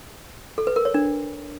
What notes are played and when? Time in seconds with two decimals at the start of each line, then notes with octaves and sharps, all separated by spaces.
0.58 A4
0.67 B4
0.76 A#4
0.85 C#5
0.94 D4